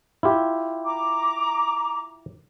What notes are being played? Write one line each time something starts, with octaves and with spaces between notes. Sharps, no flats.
E4 F4 G4
A#5 D6